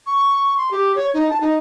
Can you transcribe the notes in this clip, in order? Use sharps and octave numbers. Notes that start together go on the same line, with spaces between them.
C#6
C6
G4
C#5
D#4
A5
D#4